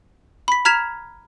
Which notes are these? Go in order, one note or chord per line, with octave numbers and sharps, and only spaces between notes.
B5 B6
A#5 F6 G#6 B6 E7 F7